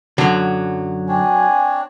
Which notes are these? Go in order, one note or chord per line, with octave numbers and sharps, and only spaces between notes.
F#2 D3 F#3
C4 D4 C#5 G#5